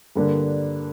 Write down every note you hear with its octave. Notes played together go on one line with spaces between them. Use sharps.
G2 D3 A#3 D4